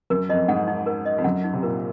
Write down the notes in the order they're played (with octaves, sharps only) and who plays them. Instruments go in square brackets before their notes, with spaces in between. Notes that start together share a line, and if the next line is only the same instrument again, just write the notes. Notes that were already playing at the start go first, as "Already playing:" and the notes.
[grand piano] F#2 [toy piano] A#4
[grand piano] F2 [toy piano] D#5
[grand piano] G#2 [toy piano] F#5
[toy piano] D#4
A#4
D#5
[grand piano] F2
[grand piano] F#2 [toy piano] F#5
[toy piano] D#4
[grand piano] C3
[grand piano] A#2 [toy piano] A#4